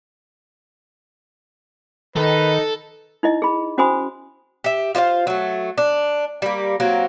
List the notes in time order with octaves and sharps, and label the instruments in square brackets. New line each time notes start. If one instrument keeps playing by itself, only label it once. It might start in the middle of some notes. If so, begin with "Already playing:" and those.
[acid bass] D#3 [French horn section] D#4 [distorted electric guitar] A4 [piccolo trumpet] B4
[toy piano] D#4 E4 D#5
G#4 B5
C#4 F#4 C5 G#5 B5 D#6
[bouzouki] G4 E5
F4 C5 C#5 F5
F#3 A3
D4
G3 A#3
F#3 A#3 C4